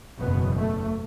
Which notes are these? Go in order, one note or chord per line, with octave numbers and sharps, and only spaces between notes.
F#1 E2 B2 B3
A3